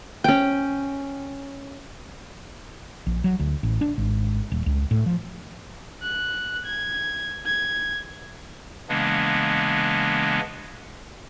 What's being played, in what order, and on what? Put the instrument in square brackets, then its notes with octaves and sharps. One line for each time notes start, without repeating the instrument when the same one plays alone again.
[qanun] C#4 G5
[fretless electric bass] A#1
F#3
D2
A1
D4
G#1
D#1
C#2
A2
F3
[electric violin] F#6
G#6
G#6
[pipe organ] C#3 E3 G#3 A#3 B3 D4